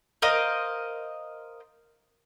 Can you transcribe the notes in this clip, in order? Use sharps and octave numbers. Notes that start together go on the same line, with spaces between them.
A#4 C5 D#5 F5